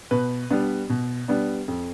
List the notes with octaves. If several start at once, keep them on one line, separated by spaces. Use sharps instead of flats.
B2 B4
G3 B3 D4
B2
G3 B3 D4
F2